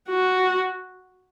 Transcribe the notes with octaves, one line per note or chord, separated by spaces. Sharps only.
F#4